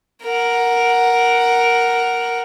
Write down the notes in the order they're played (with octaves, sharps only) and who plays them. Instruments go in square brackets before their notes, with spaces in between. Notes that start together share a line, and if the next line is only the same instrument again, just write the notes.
[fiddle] A#4 F#5